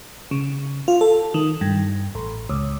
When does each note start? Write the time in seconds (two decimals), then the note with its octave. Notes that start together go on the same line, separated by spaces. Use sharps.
0.31 C#3
0.88 F4
1.01 A4
1.34 D#3
1.61 G2
2.15 A1
2.49 C#2